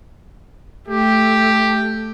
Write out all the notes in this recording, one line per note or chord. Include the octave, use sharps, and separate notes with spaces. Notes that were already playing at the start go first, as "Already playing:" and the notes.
A3 G4